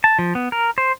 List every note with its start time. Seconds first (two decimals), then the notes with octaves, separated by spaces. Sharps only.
0.04 A5
0.19 F3
0.35 B3
0.52 A#4
0.78 C5